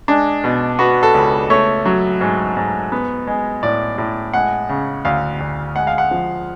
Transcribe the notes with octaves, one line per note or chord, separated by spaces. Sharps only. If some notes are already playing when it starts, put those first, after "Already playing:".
G#3 D4
B2
B3 F#4
A4
C#2
A3 C#5
F#3
G#2
G#2
B3
G#3
A2 D5
A2
G#3 F#5
C#3
D2 F5
D2
G#3 F#5
F5
F#5
F3